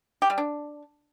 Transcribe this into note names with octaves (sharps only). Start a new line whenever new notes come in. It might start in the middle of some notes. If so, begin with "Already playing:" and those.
G4
G3
D4